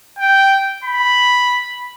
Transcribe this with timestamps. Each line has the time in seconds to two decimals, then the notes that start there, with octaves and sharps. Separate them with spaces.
0.19 G5
0.84 B5